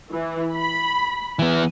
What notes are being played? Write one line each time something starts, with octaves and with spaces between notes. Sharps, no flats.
E3
B5
E3 B3